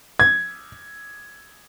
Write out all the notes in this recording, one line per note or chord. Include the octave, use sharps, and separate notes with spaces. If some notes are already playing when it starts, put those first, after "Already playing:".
G#6